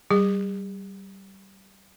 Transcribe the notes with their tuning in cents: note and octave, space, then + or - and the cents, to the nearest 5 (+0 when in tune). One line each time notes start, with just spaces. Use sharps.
G3 -20 G#4 -40